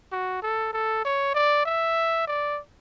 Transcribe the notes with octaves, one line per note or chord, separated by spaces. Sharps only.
F#4
A4
A4
C#5
D5
E5
D5